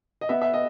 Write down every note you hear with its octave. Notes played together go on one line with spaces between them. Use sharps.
D#5
B3 E5
E5
D#5